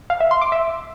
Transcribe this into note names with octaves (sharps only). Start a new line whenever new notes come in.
F5
E5
C6
D6
E5